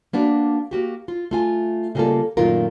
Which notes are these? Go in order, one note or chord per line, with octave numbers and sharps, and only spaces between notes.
A#3 B3 D4 F#4
A#3 F#4 G4
F4
A3 F4 G#5
C#3 G3 G#3 A#3 F4 A4
F#2 A#2 D#3 A3 F4 A#4